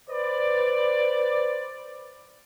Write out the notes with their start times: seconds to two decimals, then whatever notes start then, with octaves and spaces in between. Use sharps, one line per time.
0.10 B4 C5 D5